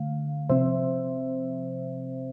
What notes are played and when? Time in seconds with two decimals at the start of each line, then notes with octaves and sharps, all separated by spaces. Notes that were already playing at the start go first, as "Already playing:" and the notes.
Already playing: D3 A3 F5
0.49 C3 F3 C4 C5 E5